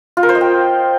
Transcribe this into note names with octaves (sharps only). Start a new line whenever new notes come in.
F4
A#4
C5
D#5
G5